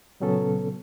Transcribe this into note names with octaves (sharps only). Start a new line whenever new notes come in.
A#2 C#3 F#3 B3 C#4 A4